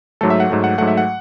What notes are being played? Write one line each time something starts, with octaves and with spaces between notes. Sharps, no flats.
G#2 F#3 A3 A4
E5
F#5
G#2 F#3 A3
F#5
G#2 F#3 A3 F#5
E5
F#5